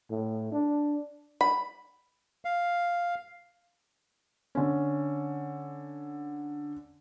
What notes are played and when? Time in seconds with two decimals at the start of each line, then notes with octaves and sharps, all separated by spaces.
0.10 A2
0.52 D4
1.41 B5
2.45 F5
4.55 D3 C#4